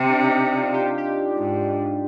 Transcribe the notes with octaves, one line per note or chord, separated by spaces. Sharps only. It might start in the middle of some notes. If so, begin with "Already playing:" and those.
Already playing: C3
D4
D#4
D#4
F4
G4
F4
G4
G#2